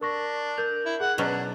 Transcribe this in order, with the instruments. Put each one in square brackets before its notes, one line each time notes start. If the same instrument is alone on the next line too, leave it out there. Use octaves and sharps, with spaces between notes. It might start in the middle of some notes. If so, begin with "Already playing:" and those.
[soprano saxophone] D4 [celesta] A#4 C#6 A#6
[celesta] A#4 G6 F7
[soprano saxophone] E4
[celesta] G#4 [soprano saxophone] F#5
[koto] B2 F#3 C#4 [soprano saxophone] D4